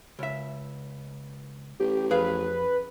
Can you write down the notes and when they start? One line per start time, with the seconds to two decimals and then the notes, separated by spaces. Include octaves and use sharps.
0.19 C#2 E5
1.80 A1 G4
2.11 F2 G#4 B4 F5